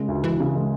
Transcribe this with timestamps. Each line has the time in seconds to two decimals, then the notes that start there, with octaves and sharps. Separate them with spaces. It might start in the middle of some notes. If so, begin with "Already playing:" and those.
Already playing: C#3 G#3
0.08 D2
0.24 D2 E3
0.40 C#3
0.55 G#3